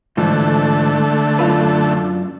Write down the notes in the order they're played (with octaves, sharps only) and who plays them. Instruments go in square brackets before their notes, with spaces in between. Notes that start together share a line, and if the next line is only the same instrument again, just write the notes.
[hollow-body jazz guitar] G#2 E3 F3 [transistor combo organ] D3 A3
[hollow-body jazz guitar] F#2 F4 B4